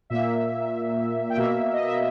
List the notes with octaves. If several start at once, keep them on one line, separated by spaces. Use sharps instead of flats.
A#2 A#3 E5
G5
B2 A#3 E5
D#5
E5